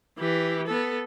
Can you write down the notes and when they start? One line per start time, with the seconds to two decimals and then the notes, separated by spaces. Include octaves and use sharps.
0.18 E3 G4
0.67 B3 A4